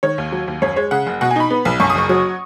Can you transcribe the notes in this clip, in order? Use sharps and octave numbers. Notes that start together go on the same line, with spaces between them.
D#3 C#5
D#2
F#3
D#2
F#2 C#5
G#3 C#5
C#3 F#5
F#1
B2 F#5
G#5
D#4 B5
B3
B1
F#2 C#6
D#6
F#1 C#6
F#3